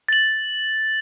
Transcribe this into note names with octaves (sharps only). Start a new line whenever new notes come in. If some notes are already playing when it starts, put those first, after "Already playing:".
A6 F#7